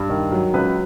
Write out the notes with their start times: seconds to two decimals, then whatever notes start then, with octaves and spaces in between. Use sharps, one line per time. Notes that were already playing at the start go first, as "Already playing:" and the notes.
Already playing: G2
0.10 D#3
0.32 F#3
0.53 C#2 B4